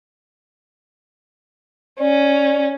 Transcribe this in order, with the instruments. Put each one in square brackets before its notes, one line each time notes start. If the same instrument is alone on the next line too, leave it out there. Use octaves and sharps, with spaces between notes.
[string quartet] C#4 [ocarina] D5